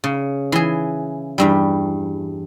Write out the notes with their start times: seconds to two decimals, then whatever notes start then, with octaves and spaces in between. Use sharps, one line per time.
0.04 C#3
0.52 E3 G#4
1.38 E2 G2 G3